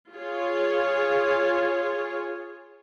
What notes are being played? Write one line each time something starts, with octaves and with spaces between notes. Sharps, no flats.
F4 G#4 C#5